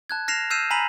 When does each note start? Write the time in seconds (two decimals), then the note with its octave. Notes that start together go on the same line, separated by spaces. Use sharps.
0.10 A5 F#6 G#6
0.28 F6 A#6 C7 E7 F7
0.50 E6 F6 G6 C7 D#7 E7
0.71 G#5 A#5 B5 B6 D#7 F#7